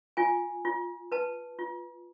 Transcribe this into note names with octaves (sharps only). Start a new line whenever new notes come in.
F4 G#5
F4
B4 A5
F4